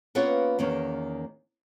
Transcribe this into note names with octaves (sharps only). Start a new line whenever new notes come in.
A#3 B3 C#4 F4 B4 C#5
E2 D#3 A#3 C#4